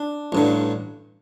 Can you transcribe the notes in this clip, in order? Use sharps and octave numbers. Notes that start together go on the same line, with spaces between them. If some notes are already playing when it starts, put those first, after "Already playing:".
Already playing: D4
A1 G2 D3